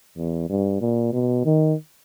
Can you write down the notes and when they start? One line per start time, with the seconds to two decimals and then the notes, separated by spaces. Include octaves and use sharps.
0.17 E2
0.49 G2
0.81 A#2
1.13 B2
1.45 D#3